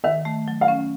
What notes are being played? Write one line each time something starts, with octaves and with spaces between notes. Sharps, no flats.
D#3 E5
A3
F#3
F5
C#4